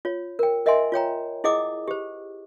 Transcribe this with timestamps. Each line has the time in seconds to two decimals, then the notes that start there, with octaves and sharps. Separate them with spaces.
0.05 F4 C#5
0.39 A#4 G5
0.66 A#4 D#5 E5 F#5 G#5 C6
0.92 F4 C#5 G5 A#5
1.44 E4 G#4 D#5 F#5 D6 D#6
1.88 G4 C5